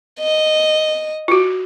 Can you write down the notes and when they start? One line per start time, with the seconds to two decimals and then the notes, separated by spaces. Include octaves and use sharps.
0.20 D#5
1.28 F4 F#4